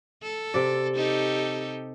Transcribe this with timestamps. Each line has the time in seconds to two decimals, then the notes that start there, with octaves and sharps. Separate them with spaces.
0.23 A4
0.54 C3 D5
0.96 D#4 G4 A4